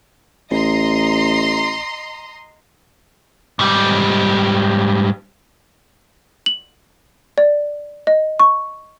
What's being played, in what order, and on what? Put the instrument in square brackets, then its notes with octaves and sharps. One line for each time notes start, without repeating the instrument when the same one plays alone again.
[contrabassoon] A1 [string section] D#5 A#5 C6
[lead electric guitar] G#2 G3
[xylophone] F#7
D5
D#5
C#6